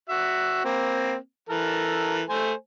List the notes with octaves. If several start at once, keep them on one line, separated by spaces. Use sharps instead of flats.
F#4 E5
A#3 C4
E3 A4 A#4
A3 C5 G#5